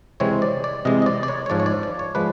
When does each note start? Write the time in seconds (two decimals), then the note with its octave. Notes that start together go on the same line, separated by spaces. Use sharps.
0.20 C3 E3 G#3 C4 C#5
0.42 D5
0.64 D5
0.85 C3 E3 G#3 C4 D#5
1.02 D#5
1.06 D5
1.23 D5
1.28 C#5
1.46 C#5
1.50 G#2 F3 G#3 D5
1.60 C#5
1.66 D5
1.83 D5
1.99 C#5
2.15 F3 G#3 B4